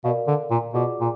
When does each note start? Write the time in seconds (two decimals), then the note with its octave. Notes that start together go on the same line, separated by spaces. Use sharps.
0.04 B2 F5
0.07 A#4 D5
0.27 D3
0.50 A#2
0.74 B2 F4 G#4 D5 F#5 D6
1.00 A#2